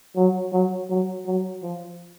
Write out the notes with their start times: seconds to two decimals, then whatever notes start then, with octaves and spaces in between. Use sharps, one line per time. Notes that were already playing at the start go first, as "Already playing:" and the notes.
0.16 F#3
0.53 F#3
0.89 F#3
1.26 F#3
1.63 F3